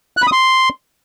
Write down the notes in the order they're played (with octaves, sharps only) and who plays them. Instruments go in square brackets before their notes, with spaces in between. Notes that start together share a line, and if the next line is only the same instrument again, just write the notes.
[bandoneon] F#6
B5
D#6
C6